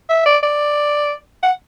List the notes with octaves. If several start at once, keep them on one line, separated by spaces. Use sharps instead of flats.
E5
D5
D5
F#5